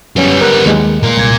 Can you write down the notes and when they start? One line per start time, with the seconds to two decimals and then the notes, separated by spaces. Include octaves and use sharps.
0.16 F#2 G3 B3 C#4
0.41 A#4 F#6
0.66 D#2 G#3
1.03 A#2 A#4
1.17 C2 G#6